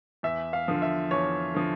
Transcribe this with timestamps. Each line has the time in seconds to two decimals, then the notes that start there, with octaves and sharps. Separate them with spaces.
0.23 E2 E5
0.53 F5
0.68 D3 F3
0.82 E5
1.11 E2 C#5
1.54 D3 F3